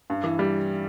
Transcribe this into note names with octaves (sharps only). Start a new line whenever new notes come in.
G2
E3
G3